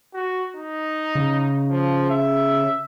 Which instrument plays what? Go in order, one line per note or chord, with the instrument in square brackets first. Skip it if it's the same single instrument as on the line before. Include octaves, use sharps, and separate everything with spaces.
[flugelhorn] F#4
D#4
[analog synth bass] C#3
[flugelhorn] F3
E5